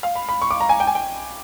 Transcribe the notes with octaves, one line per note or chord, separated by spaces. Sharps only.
F5
B5
B5
C#6
D6
A#5
G#5
G5
G#5
G5